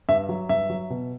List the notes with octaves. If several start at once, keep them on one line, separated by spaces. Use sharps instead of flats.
G2 E5
F#3
G2 E5
F#3
B2